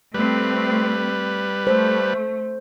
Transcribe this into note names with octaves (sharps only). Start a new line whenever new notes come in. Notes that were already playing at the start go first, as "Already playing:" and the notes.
G3 A3 C4 B4
A3 C5